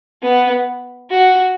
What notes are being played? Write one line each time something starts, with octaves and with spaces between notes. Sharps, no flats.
B3
F#4